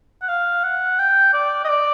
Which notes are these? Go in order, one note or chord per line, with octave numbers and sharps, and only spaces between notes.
F#5
F5
F#5
G5
D5
D#5
D5